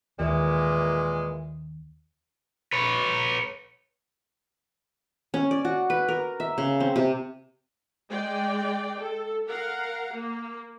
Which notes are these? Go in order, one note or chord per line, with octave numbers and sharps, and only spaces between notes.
D#2 A#2 E3 G#3
B4 C#5
C#4
D5
F#4
B4
A#4
E5
C#3
C4
C3
G#3 D5 G5
A4
A#4 F5 F#5
A#3